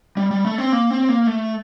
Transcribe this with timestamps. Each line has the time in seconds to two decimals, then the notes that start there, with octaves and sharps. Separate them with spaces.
0.17 G3
0.31 G3
0.45 A3
0.58 C4
0.72 A#3
0.90 C4
1.09 A#3
1.27 A3